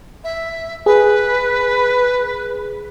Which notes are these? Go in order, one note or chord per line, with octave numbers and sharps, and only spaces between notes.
E5
G#4 B4